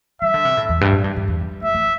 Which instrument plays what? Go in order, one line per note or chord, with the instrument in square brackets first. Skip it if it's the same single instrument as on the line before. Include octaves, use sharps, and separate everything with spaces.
[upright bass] G3 [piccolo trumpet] E5
[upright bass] D3
C3
A2
E2
G2
A2
G2
G2
E2
G3
[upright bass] A3 [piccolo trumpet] E5
[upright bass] A3